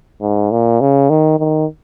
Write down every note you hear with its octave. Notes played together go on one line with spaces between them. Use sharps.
G#2
A#2
C#3
D#3
D#3